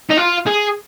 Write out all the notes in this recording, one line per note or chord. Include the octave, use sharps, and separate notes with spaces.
D#4
F4
G#4